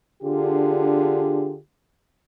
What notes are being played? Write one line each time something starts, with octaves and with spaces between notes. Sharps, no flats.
D3 D4 F4 G4 G#4